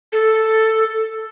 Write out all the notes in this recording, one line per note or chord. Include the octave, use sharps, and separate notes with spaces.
A4